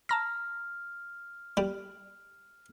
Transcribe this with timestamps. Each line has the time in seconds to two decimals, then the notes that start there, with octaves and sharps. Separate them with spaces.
0.09 A5 A#5 F6 A#6
1.57 G3